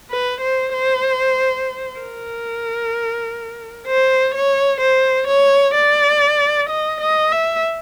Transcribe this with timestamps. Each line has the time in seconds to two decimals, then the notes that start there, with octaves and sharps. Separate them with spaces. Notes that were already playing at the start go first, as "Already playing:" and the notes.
0.11 B4
0.41 C5
0.73 C5
1.99 A#4
3.87 C5
4.35 C#5
4.81 C5
5.28 C#5
5.75 D5
6.70 D#5
7.01 D#5
7.32 E5